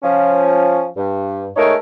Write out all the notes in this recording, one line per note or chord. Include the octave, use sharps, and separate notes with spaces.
F3 C#4
G2
G#3 A3 D#4 A#4 C#5